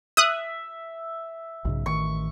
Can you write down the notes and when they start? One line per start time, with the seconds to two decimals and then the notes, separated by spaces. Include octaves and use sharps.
0.17 E5 D#6 F#6
1.65 B1 G#2 C#3
1.86 A1 D#3 C#6